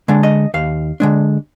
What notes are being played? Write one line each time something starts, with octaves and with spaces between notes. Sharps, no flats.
D3 G#3 D4
D#5
D#2 F5
D3 G#3 D4